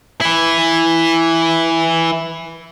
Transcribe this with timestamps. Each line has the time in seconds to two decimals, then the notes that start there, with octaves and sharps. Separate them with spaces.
0.21 E3 E4